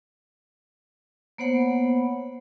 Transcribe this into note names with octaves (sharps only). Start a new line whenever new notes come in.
A#3 B3 C5 C#5 F#5 B5